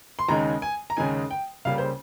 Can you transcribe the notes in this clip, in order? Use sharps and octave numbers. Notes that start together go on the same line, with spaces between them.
C6
D#2 C#3 G#3 D#4 A#5
G#5
A#5
D#2 C#3 G#3 D#4 G#5
G5
C#2 C#3 G3 A#3 F5
C5